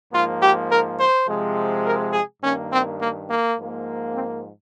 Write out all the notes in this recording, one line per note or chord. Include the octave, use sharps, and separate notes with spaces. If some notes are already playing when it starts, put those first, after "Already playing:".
G#2 F3 A#3 F4
G4
A#4
C5
C3 F3 G#3
A#4
G#4
G2 D#3 A#3 C#4
C4
A#3
A#3
G#2 F3 A#3
C4